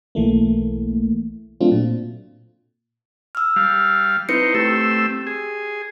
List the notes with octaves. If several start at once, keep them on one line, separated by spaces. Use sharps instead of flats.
B1 E3 A3 A#3
F#3 A3 C4 D4 F4
A#2
E6 F6
G3 F5
C4 D#4 E4 B4 C#7
A3 C4 G4 E6
G#4